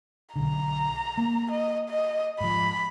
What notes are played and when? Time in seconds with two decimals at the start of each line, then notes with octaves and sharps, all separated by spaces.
0.36 B1 D3 A#5
1.18 A#3
1.52 D#5
1.90 D#5
2.41 G#2 F3 B5